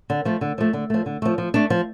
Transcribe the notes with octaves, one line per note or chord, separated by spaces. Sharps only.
D3
F3 A3
D3
F3 A3
D3
F3 A3
D3
F3 A3
F3
A3 D4
F3